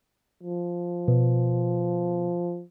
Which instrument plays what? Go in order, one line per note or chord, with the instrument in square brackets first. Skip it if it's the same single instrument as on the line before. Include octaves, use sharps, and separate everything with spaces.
[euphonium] F3
[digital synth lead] B2